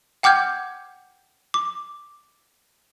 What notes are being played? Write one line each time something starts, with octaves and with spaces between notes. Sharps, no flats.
F#5 G5 D6 F6 G6 G#6
D6